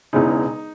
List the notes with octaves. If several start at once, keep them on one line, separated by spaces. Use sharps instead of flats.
E1 E2 C#3 E3 D#4